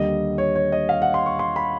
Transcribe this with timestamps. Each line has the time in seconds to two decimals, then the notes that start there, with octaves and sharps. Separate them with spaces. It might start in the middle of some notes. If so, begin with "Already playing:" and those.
Already playing: D#2 D3 G3 D#5
0.38 C#5
0.56 C#5
0.72 D#5
0.89 F5
1.02 F#5
1.14 C6
1.26 C#6
1.39 C6
1.56 B5